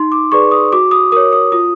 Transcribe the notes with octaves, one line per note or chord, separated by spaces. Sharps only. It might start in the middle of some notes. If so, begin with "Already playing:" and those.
Already playing: D#4 C6
D6
G#4 B4 D5 C#6
D#6
F#4 D6
D#6
A#4 C#5 D#6
D#6
F4 D#6